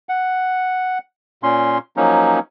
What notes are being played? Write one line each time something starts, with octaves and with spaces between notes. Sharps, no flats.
F#5
A#2 C#4 C6
F3 F#3 A#3 C#4 D#4